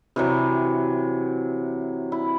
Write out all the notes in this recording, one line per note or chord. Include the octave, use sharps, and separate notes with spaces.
C3 E3 F#3
E4